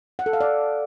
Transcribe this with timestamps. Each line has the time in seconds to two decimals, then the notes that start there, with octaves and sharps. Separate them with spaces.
0.19 F#5
0.26 A4
0.33 F5
0.41 D5